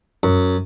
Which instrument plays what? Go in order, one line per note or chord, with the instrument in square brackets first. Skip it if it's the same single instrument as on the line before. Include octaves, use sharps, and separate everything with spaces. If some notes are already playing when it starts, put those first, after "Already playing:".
[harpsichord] F#2